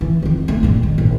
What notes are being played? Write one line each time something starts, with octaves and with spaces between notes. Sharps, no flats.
E3
F2 D#3
A3
G2 A#2
D#3
A#1